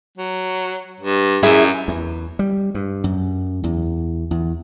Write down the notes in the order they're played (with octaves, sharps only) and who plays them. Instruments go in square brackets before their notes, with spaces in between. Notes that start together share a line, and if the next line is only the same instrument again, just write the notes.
[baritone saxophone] F#3
G2
[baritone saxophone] F#2 [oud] E4 G#4 E5
[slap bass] E2
G3
G2
F#2
E2
E2